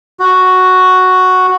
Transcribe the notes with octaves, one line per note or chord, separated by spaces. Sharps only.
F#4